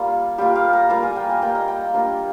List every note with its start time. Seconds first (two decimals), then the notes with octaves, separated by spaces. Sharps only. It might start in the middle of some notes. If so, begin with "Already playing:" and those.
Already playing: G3 A#3 F4
0.38 G3 A#3 F4 G4
0.55 F5
0.73 A#5
0.90 G3 A#3 F4 A#5
1.03 G#5
1.16 G5
1.29 G#5
1.42 G3 A#3 F4 G5
1.55 D#5
1.68 G5
1.94 G3 A#3 D4 F4